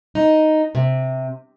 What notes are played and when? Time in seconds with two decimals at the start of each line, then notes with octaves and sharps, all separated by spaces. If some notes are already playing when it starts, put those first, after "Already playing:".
0.15 D#4
0.75 C3